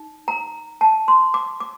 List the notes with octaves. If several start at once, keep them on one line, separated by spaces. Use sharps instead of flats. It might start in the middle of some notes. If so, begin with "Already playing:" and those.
Already playing: D#4
A#5
A5
C6
D6
D6